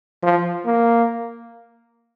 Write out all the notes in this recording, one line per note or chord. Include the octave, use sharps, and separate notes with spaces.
F3
A#3